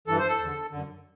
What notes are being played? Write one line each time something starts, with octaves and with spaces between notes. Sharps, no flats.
G2 E3 A4
C5
A4
E2 D3
F#2 D3